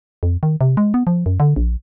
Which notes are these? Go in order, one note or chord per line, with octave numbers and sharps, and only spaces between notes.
F2
D#3
C3
G#3
B3
F3
F#2
D3
A#1